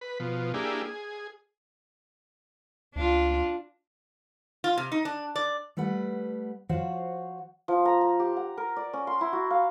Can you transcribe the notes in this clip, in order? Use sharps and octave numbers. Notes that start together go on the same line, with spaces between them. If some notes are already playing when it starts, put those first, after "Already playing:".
B4
B2 F3
A#3 D4 E4 G4 G#4
G#4
C#2 D4 F4
F4
C3
D#4
D4
D5
G3 A3 B4 F#5
F3 F#4 C5 C#5 F5 F#5
F3
A#5
A#5
G4
F#5
A#4
D5
C#4
C6
E4
F#4
F5